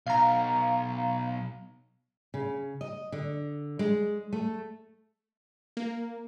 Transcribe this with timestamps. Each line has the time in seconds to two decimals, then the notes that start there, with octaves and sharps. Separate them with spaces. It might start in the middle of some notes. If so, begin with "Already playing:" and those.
0.07 B1 F5 A#5
2.34 C#3
2.81 D#5
3.12 D3
3.79 G#3
4.33 A3
5.77 A#3